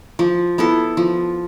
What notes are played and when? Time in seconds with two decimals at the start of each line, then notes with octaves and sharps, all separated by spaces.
0.19 F3
0.58 B3 E4 A4
0.97 F3